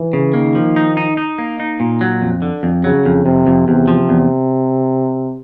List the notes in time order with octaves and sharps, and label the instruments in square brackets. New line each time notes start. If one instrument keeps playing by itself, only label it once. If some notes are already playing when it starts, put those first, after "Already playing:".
Already playing: [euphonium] E3
[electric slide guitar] C#3
[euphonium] D#3 [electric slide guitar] A#3
[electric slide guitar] F3
D#4
D#4
D#4
A#3
D#4
A#2
F#3
F2
D3
F2
[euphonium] C#3 [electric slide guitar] F#3
[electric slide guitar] F2
[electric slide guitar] F2 [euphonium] C3
[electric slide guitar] F2
[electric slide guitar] E2 [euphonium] C3
[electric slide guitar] F3
E2